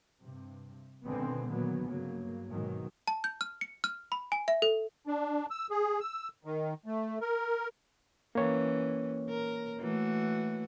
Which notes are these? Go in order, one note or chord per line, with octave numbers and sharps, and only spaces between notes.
G2 C3
B2 D3 D#3 G#3 B3 C4
A#2 D#3 F#3 A#3 B3
G2 C#3 F#3 A#3
G#2 B2 D#3 F#3
A5
G6
F6
C#7
F6
B5
G#5
E5
A4
D4
E6
G#4
E6
D#3
A3
A#4
E3 A#3 C#4 C#5
A#4
E3 A3 F#4